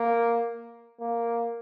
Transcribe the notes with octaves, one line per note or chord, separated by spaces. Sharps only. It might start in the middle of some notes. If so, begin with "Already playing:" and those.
Already playing: A#3
A#3